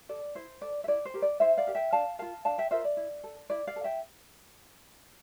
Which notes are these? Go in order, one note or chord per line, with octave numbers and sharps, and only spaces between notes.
A4 D5
E4 C5
A4 D5
E5
E4 D5
C5
G4 A#4
D5
E4 C5 E5
D5 F5
G4 A#4
E5 G5
D4 F5 A5
F4 A#4 F5 A5
D4 F5 A5
E5 G5
F4 A#4 C5 E5
D5
E4
A4
E4 D5
D5 F5
A4
E5 G5